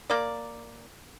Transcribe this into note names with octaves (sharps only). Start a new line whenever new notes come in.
A#3 D5